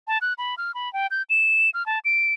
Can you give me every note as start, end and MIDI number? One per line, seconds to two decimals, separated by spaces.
0.08 0.18 81
0.21 0.33 90
0.38 0.55 83
0.58 0.74 89
0.74 0.91 83
0.93 1.07 79
1.11 1.22 91
1.30 1.70 100
1.74 1.85 89
1.86 1.99 81
2.05 2.34 98